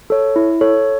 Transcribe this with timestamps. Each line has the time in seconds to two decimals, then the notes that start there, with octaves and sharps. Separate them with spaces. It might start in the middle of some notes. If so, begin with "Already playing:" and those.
0.10 A4 C#5
0.36 E4
0.61 A4 C#5